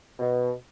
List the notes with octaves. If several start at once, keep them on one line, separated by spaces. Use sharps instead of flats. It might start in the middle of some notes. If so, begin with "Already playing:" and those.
B2